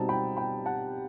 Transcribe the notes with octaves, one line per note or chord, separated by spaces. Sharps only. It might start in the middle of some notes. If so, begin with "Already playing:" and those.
Already playing: B2 G3 C4 D#4 A5
G5 B5
G5 B5
F#5 A5